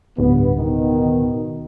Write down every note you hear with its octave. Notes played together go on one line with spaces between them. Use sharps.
D1 G2 B3
B2 D#3